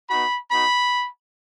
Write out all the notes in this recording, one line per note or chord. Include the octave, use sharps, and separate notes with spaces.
B3 D#4 F#4 B5
B3 D#4 F#4 B5